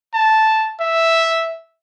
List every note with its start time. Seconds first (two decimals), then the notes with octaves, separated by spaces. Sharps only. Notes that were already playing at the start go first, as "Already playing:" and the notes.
0.14 A5
0.80 E5